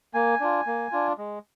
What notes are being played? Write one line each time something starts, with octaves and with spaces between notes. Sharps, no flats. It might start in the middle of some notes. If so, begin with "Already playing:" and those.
A#3 G#5
D4 F4
A#3
D4 F4
G#3